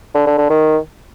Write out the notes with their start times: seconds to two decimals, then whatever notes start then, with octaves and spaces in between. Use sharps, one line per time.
0.15 D3
0.27 D3
0.38 D3
0.50 D#3